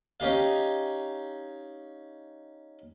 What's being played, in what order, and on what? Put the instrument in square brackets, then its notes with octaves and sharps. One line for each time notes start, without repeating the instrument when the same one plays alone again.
[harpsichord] C#4 D#4 G4 F5